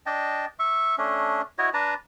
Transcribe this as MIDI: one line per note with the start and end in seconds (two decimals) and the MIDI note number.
0.06 0.46 62
0.06 0.46 75
0.06 0.46 79
0.06 0.46 81
0.59 0.96 76
0.59 0.96 85
0.98 1.42 57
0.98 1.42 61
0.98 1.42 62
1.58 1.70 64
1.58 1.70 66
1.58 1.70 73
1.58 1.70 75
1.74 1.94 62
1.74 1.94 71
1.74 1.94 81
1.74 1.94 82